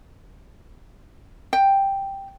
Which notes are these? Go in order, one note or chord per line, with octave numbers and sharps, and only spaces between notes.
G5